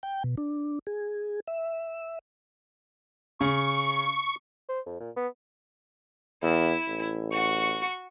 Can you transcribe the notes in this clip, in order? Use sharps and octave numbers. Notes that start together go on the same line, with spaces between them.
G5
B2
D4
G#4
E5
C#3 C#6
C5
F2
A#2
B3
E2 E4
A1
F#4 C#6